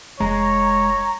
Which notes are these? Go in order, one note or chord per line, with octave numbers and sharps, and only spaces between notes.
F1 G#3 C#5 A#5